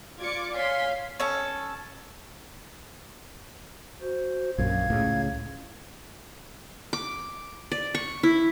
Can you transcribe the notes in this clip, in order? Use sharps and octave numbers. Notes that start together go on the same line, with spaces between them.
F4 D5 D6 G#6 C#7
C#5 F5 G#5 C6 B6
C#4 A4
F#4 C5
A#1 F#2 F5 G#6
C#2 A2 C#3
D6
D5
C#6
E4